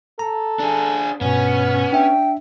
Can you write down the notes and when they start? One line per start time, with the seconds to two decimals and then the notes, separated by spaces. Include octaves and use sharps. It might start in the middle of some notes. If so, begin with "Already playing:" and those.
0.19 A4 A#5
0.59 D4 G#4
1.21 G2 B2 B3 C#4
1.93 D4 E5 G5